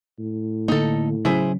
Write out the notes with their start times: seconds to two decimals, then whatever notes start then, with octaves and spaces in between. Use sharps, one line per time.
0.19 A2
0.68 D3 A#3 D#4 A4
1.25 C#3 F#3 C#4 E4 G#4 C5